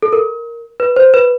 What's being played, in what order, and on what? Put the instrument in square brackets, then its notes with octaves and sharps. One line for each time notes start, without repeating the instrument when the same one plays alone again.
[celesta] A4
A#4
B4
C5
B4